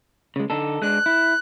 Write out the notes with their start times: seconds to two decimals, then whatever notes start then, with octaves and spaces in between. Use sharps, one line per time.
0.36 C#3 G#3
0.50 D3 D#4 A4
0.82 G#3 D4 F#6
1.06 E4